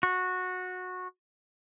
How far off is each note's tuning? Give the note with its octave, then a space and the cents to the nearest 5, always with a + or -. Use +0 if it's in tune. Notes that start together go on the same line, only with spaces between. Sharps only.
F#4 -15